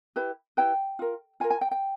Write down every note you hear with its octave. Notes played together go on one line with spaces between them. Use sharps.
E4 G4 B4
E4 G4 B4 G5
F4 A#4
F4 A#4 G#5
G#5
G5
G5